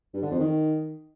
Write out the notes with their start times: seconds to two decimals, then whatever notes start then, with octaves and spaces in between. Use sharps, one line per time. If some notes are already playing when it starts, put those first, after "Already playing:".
0.14 G2
0.22 D3
0.31 F2
0.39 D#3